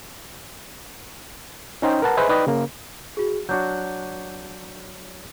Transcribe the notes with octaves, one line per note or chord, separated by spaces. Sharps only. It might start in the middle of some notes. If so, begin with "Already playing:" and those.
C#4 D#4 C5 G5
A#4 B4 F#5 A5 A#5
G#4 B4 C5 D#5 E5 G#5
D#4 B4 D5 D#5 G5
C#3 A#3
F#4 G#4
F#3 D4 F#4 C#5 G6